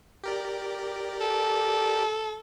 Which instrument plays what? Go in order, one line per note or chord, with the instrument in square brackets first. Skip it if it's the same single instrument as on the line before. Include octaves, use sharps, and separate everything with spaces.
[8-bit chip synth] G4 A#4 D5
[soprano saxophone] A4